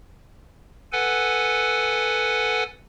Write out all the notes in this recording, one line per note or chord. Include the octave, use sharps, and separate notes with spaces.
A4 B4 F#5 G#5